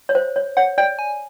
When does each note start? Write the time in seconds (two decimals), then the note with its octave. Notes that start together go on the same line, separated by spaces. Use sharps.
0.09 C#5
0.15 C5
0.36 C#5
0.57 C#5 F#5
0.78 D5 G5
0.99 G#5